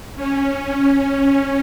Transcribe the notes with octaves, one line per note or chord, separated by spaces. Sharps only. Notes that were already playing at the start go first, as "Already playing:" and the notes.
C#4
C#4